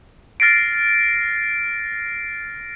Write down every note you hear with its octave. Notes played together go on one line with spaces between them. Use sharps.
F6 A6 A#6 C7 D7